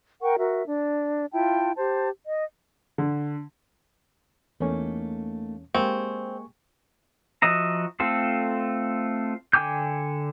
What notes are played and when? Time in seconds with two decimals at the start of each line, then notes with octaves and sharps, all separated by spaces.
0.22 A#4 F#5 G5 C#6
0.39 F#4 A#4 E5
0.66 D4
1.33 E4 F4 G5 A5
1.77 G4 C5 A5
2.26 D#5
2.98 D3
4.60 E2 A3 A#3 C#4 D#4
5.75 G#3 A#3 C4 G4 G#5 C#6
7.42 F3 F#4 D#5 E5 A#5
8.00 A3 C4 F4 A4
9.53 D3 G5 G#5 D6 G6